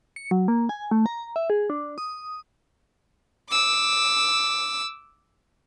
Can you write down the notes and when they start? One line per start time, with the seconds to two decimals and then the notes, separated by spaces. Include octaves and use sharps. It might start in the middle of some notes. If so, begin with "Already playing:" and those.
0.16 C#7
0.31 F#3
0.48 A#3
0.69 G#5
0.91 A3
1.06 A#5
1.36 E5
1.50 G#4
1.70 D4
1.98 D#6
3.49 D6 E6